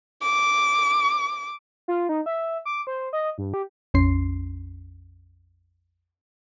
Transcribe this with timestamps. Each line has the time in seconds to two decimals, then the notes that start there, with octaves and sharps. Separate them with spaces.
0.22 D6
1.88 F4
2.09 D#4
2.26 E5
2.65 D6
2.87 C5
3.13 D#5
3.38 G2
3.54 G4
3.94 A#1 F2 C#4 C6 C7